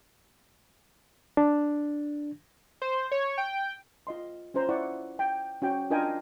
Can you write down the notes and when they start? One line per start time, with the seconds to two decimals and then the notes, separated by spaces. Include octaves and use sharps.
1.37 D4
2.82 C5
3.11 C#5
3.38 G5
4.07 F4 D#5 C6
4.54 C#4 F4 C5 A#5
4.69 E4 D5 F#5 C#6
5.19 G5
5.62 C#4 F#4 G5
5.90 D4 F4 A#4 D#5 G5 G#5